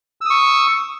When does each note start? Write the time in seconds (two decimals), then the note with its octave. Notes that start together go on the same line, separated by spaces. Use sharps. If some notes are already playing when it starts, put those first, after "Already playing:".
0.21 E6
0.26 D#6
0.30 C#6